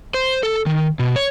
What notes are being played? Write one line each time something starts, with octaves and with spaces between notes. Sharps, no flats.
C5
A4
D#3
B2
C#5